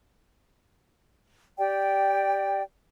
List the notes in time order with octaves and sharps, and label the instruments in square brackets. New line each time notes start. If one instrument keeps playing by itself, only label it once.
[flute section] G4 D5 G5